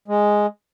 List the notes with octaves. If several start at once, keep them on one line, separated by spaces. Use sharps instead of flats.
G#3